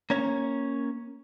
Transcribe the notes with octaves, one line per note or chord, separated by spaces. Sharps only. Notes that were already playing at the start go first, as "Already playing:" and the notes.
A#3 C#4 C#5